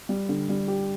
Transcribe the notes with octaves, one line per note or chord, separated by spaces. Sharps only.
G3
D3
G3
G4